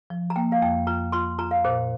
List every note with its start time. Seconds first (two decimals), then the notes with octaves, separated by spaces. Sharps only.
0.10 F3
0.30 A#5
0.36 A#3 G5
0.52 F5
0.62 F2 G5
0.87 F4 A#5
1.12 F4 C6
1.39 F4 A#5
1.51 F5
1.65 A#2 C5